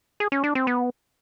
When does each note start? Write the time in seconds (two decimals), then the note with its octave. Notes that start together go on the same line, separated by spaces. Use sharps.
0.20 G#4
0.32 C#4
0.44 D4
0.55 C4
0.67 B3